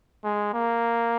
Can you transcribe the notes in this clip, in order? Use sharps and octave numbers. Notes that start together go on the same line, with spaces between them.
G#3
A#3